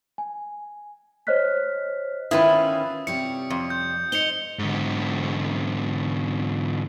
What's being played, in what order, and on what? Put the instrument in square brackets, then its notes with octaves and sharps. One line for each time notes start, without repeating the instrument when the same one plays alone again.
[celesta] G#5
C5 C#5 D#5 F6 F#6 B6
[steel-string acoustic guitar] D#3 B3 C#4 [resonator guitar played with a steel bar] E4 F4 B4 [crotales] D#6
[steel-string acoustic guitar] C3 G3 C#5 [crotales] C#7
[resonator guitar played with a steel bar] F2
[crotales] G6
[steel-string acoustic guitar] D#4 C5 D#5 [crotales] C#7 F7 G7
[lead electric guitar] G#2 D3